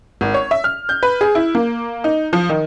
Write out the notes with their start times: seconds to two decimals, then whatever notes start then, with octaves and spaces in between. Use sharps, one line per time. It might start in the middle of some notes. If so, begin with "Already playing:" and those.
0.21 G#1
0.34 C#5
0.51 E5
0.64 F6
0.89 G6
1.03 B4
1.21 G#4
1.35 E4
1.55 A#3
2.04 D#4
2.33 F3
2.49 D#3